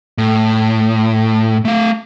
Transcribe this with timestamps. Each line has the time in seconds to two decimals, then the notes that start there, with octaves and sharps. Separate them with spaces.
0.18 A2
1.65 A3 F5